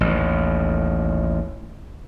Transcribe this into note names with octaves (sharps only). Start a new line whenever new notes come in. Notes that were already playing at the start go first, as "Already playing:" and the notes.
A1 D#2